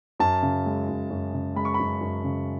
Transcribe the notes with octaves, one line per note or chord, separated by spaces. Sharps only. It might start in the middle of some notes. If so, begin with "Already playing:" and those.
F#2 A5
C#3
G#3
F#2
F#2
C#3
G#3 B5
C#6
F#2 B5
F#2
C#3